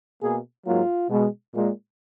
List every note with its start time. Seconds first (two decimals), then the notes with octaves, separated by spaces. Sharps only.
0.22 B2 A#3 G#4
0.67 G#2 F#3 A#3 F4
1.10 B2 G#3
1.55 A#2 G#3